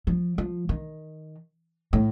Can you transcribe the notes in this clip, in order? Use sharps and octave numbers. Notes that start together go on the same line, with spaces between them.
F3
F3
D#3
A2